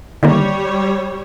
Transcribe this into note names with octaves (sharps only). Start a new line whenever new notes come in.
D3 D#3 G3 A#3 C#5